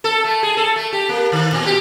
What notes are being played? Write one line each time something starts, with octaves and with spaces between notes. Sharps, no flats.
A4
A3
G#4
A4
A3
G4
A#3
D#3
A#2
G4